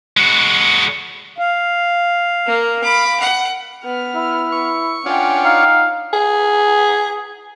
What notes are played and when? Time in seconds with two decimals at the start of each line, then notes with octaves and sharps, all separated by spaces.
0.17 G#3 F#4
1.38 F5
2.47 A#3
2.83 B5 D6
3.21 F#5
3.84 B3 F6
4.16 E4
4.52 C#6
5.06 C#4 D4 F4 C#5 F#5 G5
5.45 D#4 F5
6.13 G#4